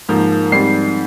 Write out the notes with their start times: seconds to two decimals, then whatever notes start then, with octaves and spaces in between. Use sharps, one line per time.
0.09 G#2 F3 A#3
0.52 G#2 G3 C4 C7